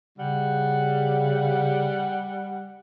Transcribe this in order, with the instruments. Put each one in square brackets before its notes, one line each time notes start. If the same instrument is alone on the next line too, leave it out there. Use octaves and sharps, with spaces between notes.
[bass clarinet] C#3 [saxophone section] G3 F#5